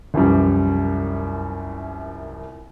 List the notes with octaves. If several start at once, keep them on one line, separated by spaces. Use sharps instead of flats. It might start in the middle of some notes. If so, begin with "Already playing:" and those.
C2 F#2 E3 F3 G3